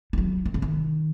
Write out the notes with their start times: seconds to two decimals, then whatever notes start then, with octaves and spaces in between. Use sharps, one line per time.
0.13 D#3
0.18 F#3
0.46 D#3
0.54 C#3
0.62 D#3